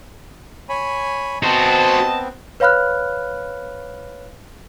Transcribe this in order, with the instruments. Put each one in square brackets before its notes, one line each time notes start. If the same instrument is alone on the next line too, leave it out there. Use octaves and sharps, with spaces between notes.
[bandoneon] C#5 G#5 B5
[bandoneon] B3 C4 [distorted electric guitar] F#4 C5 [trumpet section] D#5 A5
[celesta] B4 C#5 F5 B5 F6 F#6